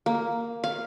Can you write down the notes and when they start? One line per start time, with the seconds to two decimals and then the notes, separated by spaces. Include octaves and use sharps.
0.06 A#3
0.64 F5